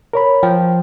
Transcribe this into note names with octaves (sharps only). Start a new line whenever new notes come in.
A#4 C#5 B5
F3 G5